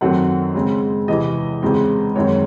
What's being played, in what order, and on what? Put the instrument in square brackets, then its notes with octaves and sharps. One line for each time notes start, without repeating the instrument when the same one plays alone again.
[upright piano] F#2 D#3 F#3 A3 C4 F#5
C#3 G#3 C4
E2 C3 E3 D#5
E2 C#3 G#3 C4
F#2 D#3 G#3 C4 C#5